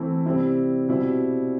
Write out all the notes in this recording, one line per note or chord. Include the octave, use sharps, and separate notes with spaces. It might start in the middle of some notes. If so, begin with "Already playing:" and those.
Already playing: E3 A3 C4 E4
C3 G3 C4 E4
B2 G3 C4 E4